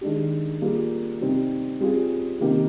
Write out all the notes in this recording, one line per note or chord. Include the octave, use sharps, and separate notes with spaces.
D#3 G#3 D4 G4
G3 A#3 F4 G#4
C3 G3 C4 D#4
G3 C4 F4 G#4
C3 D#3 A#3 D#4 G4